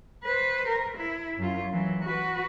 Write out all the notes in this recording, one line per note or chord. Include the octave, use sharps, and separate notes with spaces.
B4 C5
A#4
E4
F#2 F4
E3 F#3
F#4 B4